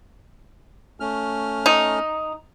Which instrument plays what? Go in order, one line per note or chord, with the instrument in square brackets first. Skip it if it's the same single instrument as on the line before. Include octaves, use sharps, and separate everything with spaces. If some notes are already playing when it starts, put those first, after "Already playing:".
[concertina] A3 C#4 F6
[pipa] D#4